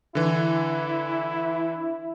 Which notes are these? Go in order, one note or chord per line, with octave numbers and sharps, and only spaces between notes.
D3 E3 E4